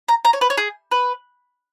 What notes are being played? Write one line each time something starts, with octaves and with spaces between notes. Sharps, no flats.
A#5
A#5
C#5
B4
C#5
G#4
B4